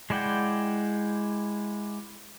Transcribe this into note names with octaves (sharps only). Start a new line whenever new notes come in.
G#3 E4 D5 F#5 G5